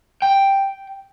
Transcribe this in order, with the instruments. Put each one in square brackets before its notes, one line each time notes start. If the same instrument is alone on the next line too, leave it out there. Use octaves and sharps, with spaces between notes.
[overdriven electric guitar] G5